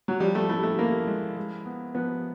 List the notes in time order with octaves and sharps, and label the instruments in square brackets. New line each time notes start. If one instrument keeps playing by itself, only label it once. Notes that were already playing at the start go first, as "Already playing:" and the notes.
[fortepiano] F#3
[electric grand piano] F3 [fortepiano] G3
[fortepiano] A3
[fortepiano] A3 [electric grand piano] E4
[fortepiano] A3
[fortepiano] A#3 [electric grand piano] E4
[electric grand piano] G#3
G#3
B3
[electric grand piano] F3 [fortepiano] B3